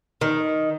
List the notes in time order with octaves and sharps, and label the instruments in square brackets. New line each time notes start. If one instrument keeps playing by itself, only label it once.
[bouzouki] D#3